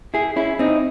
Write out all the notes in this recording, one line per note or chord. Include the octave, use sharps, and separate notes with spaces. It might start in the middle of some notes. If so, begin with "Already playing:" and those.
E4 G#4
C#4 E4
C4 D#4